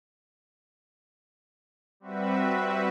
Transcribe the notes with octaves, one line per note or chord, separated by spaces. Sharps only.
G3 C4 F#4 B4 E5